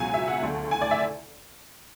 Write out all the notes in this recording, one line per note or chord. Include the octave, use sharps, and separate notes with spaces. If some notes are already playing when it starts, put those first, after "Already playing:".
Already playing: C#2 B2 F#3 G#5
E5
F#5
D2 D3 A3
G#5
D5
E5